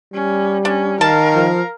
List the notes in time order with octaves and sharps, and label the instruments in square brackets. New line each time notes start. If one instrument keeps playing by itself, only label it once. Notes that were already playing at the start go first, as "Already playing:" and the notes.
[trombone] G3 [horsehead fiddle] C#4
[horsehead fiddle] C#4 [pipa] D4
[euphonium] D#3 [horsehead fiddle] A#4 F5 [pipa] A5
[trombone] F3